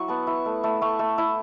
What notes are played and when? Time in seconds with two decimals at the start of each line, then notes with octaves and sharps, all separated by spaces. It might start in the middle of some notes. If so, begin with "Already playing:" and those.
Already playing: F#3 E4 C#6
0.08 B3 A5
0.27 E4 C#6
0.46 A3
0.64 A3
0.81 A3 C#6
0.99 A3
1.18 E4